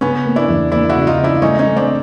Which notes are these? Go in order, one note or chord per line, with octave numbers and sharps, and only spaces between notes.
C#3 B3 C#4
A#3
D4 E4
E2
A#3 D4 E4
E4 F#4
C#3
D#4 F4
C#3
D4 E4
A3 C#4 D#4
C#4 D#4
A3
C4 D4